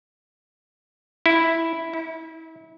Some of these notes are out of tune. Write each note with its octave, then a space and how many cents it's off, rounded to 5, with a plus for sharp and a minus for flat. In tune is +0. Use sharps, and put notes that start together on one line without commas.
E4 -5
E4 -35